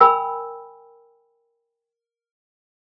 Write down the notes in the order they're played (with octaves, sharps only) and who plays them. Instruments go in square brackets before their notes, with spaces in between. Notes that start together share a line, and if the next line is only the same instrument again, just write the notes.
[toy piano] A#4 G5 G#5 B5 E6